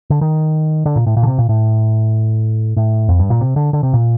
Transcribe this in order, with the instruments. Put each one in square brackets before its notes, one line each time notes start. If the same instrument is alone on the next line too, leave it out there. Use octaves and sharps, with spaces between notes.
[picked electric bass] D3
D#3
D3
A#2
A2
A#2
D3
C3
A#2
A2
A2
F2
G2
A#2
C3
D3
D3
C3
A#2